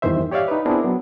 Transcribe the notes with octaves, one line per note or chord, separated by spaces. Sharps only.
E2 G2 D#3 E3 C5 E5
G4 C#5 D5 E5 F5
D#4 B4
B3 C4 D4 E4 G#4 A#4
F#3 B3